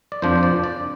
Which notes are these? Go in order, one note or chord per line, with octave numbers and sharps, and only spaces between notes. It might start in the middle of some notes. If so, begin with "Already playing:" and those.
D5
F2 F3 D4 C5
C5
D5
D5